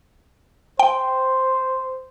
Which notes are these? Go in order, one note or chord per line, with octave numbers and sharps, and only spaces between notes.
C5 G5